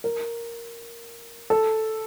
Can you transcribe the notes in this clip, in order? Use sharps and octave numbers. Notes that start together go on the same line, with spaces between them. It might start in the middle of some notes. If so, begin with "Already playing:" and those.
A#4
A4